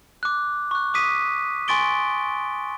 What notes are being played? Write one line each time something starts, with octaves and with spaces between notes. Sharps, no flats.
D6 F#6
C#6 F#6
D6 D#6 B6 D#7
G#5 C6 C#6 A6 D7 G7